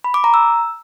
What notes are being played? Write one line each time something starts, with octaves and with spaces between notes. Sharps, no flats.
B5
D6
A#5
E6